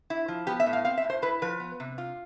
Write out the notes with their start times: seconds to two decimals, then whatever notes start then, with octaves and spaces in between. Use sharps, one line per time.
0.10 E4
0.28 F3
0.47 B3 G4
0.60 E5
0.66 A2
0.73 F5
0.85 C4 F5
0.97 E5
1.04 A2
1.10 C5
1.22 E4 B4
1.42 F3 B4
1.60 B3
1.80 C3
1.98 F4